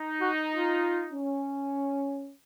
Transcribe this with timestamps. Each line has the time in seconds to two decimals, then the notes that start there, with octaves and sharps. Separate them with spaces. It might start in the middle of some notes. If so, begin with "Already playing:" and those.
Already playing: D#4
0.21 F#4
0.52 F4
1.13 C#4